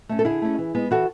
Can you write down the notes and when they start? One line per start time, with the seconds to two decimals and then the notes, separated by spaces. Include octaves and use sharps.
0.09 A3 C#4
0.19 A4
0.25 D3 E4 G#4
0.42 A3 C#4
0.58 E3
0.75 G#3 B3
0.91 E3 F#4 A4